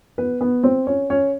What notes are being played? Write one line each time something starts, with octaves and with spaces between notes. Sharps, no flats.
B3 B4
B3 B4
C4 C5
C#4 C#5
C#4 C#5